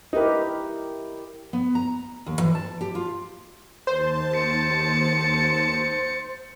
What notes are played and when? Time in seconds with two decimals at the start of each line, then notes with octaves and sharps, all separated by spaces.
0.13 D#4 E4 G4 A#4 B4
1.53 B3
1.75 A#5
2.26 D#2
2.41 E3
2.55 A5
2.81 G4
2.95 F4
3.87 D#2 C5 A5
4.35 A6 C#7